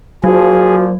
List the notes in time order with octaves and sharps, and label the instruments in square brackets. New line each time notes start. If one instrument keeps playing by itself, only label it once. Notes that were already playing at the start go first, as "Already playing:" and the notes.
[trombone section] A#2 F3 [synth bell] F#3 [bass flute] F#4 [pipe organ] G#4